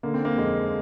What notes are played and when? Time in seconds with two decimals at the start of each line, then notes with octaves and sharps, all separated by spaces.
0.03 D3 A#3
0.14 C4
0.25 A#3
0.38 F2 G#3